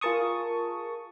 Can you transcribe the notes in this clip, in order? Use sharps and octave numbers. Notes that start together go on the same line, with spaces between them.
F4 G#4 A#4 A5 C#6 D#6